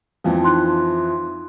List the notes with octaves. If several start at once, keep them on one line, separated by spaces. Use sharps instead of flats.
F2 E3 F3
D#4 C6 F#6